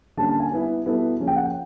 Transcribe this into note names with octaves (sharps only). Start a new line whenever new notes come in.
D3 G3 A#3 C#4 A5
A5
G#5
G3 B3 E4
B2 G3 B3 E4 A4
C#3 F3 A#3 C#4
G5
F#5
G5